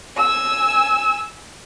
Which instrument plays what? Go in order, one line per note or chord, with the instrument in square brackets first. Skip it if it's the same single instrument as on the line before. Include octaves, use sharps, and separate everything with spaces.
[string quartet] G#5 E6